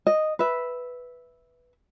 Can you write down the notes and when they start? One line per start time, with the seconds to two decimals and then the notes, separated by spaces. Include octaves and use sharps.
0.07 D#5
0.39 B4 E5